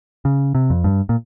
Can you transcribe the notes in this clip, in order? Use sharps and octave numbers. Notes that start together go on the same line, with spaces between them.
C#3
C3
F2
G2
A#2